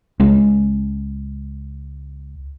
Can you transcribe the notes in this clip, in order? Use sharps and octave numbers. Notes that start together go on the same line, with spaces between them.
C#2 G#3 C#4